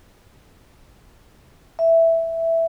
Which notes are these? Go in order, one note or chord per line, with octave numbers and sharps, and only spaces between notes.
E5